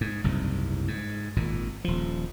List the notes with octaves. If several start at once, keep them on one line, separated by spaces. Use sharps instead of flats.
G#2
F#1 C2 G#2
G#2
G#1 A#2
D#1 F3